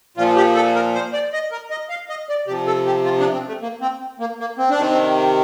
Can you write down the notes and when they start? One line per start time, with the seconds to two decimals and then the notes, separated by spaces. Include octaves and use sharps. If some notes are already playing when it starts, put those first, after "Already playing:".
0.17 A#2 F3 F4
0.36 G4
0.55 A4
0.75 A#4
0.94 C5
1.13 D5
1.33 D#5
1.51 A#4
1.70 D#5
1.89 F5
2.09 D#5
2.29 D5
2.47 C3 F3 G4
2.67 A4
2.86 G4
3.05 F4
3.20 D4
3.33 C4
3.48 A3
3.62 A#3
3.81 C4
4.20 A#3
4.40 A#3
4.58 C4
4.70 D4
4.78 C3 D#3 C4